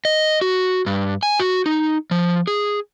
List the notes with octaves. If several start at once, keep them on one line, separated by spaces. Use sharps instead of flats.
D#5
F#4
G2
G#5
F#4
D#4
F3
G#4